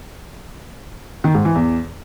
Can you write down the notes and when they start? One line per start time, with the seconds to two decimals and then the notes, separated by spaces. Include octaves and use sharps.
1.24 D#3
1.35 G#2
1.45 E3
1.55 E2